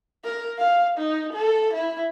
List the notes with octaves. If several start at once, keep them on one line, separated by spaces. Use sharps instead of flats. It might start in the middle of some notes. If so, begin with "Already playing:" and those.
A#4
F5
D#4
A4
E4